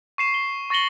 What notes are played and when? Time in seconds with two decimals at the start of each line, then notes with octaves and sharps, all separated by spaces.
0.18 C#6 C7 E7
0.34 G7
0.70 C#6 A6 A#6 C#7 F#7 G7